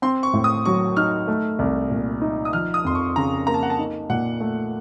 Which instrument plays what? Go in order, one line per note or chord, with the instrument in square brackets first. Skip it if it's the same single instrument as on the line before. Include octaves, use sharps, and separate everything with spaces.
[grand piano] C4 [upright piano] C6
[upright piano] C#6
[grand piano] A2
[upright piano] D#6
[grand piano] F#3 [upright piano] C#6
[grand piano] D#4 [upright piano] F6
[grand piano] A3
C2
A#2
D#4
[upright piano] D#6
[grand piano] F3 [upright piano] F6
[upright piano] D#6
[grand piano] F2 [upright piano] C6
[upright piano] C#6
[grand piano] C#3 [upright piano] A#5
[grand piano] A#3 [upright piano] A#5
[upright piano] A5
F#5
A5
[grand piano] D#4
[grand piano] A#2 [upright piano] F#5
[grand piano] A3